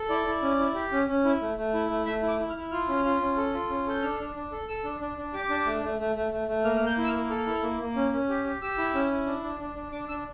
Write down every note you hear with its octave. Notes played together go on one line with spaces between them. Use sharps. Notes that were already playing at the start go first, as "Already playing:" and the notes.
Already playing: A4
E4 D5
E4
C#4
E4
G4
C#4
C#4
E4
A3
A3
E4
A3
A3 E5
E4
D6
E4
F6
E4
F4 F6
C#4
F4
C#4
A4
F4
C#4
A4 G6
D4 F6
D4
D4
A4
A4 E6
D4
D4
D4
G4 D6
D4
A3
A3
A3
A3
A3
A3
A#3 F6
A#3 F6
G6
E4
E6
F6
A#3
A4
E4
A#3
A#3
C#4
C#4
G4
G4
G4 E6
E4
C#4
E4
D4
D4
D4
D4
D4 D6
D4 E6